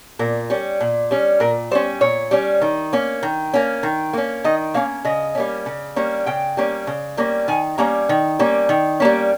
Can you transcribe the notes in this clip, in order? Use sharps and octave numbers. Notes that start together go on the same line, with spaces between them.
A#2 A#4
G3 C#4
A#2
G3 C#4
A#2 A#4
G3 C#4 C5
A#2 C#5
G3 C#4
D#3
A#3 C#4
D#3
A#3 C#4
D#3
A#3 C#4
D#3 D#5
A#3 C#4 F5
C#3 D#5
G3 A#3 C#4
C#3
G3 A#3 C#4
C#3 G5
G3 A#3 C#4
C#3
G3 A#3 C#4
D#3 G#5
G3 A#3 C#4 A#5
D#3
G3 A#3 C#4
D#3
G3 A#3 C#4